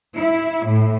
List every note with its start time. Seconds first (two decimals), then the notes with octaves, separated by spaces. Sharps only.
0.16 E4
0.67 A2